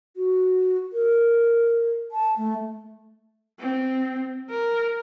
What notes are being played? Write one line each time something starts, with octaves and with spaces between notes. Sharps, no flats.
F#4
A#4
A5
A3
C4
A#4